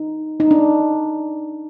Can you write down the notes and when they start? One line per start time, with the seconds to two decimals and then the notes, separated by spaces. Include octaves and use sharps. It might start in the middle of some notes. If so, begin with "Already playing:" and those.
Already playing: D#4
0.40 D#4
0.51 D4